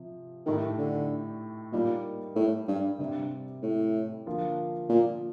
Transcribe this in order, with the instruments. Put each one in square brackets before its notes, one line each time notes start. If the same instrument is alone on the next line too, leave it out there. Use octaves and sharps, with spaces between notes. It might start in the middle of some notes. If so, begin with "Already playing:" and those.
Already playing: [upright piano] C3 F3
[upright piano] A2 A3 D#4 G4 [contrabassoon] D#3
[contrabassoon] D3
[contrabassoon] A#2 [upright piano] G3 A#3 D#4
[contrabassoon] A2
G2
[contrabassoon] G2 [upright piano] C3 G3 C4 G4
[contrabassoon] A2
[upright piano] D3 F3 A#3 F4
[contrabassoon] A#2